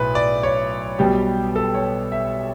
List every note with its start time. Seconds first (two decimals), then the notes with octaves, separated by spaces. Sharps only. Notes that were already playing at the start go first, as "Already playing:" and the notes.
Already playing: B1 A2 B4
0.15 D5
0.43 C#5
0.99 B1 B2 G3 G4
1.56 A4
1.74 C#5
2.12 E5